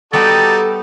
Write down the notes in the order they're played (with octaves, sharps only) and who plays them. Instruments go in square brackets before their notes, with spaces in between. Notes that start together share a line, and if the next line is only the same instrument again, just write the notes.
[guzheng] G3 B3 [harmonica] D#4 F#4 G4 [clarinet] A4 [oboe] A5